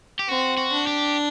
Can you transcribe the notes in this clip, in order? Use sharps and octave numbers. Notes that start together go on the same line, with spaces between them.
G4
C4 F#4
F#4
D4
G4